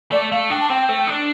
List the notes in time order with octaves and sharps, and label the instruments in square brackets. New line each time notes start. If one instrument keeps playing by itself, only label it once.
[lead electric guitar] A3 [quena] D5
[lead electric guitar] A3 [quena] F5
[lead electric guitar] D4 [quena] G5
[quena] A5
[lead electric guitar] C4 [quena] G5
[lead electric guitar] A3
D4